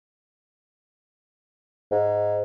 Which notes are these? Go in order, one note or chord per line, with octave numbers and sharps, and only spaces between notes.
G#2